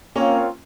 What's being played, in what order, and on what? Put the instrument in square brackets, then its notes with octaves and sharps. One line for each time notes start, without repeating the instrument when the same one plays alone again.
[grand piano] A#3 C#4 [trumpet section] C4 F4 A#4 C#5 F5